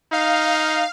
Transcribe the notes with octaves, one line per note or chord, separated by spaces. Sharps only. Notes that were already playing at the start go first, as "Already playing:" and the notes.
D#4 F5